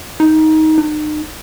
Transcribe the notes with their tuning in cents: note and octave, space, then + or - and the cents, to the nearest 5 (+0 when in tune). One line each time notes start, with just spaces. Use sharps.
D#4 +15
D#4 -40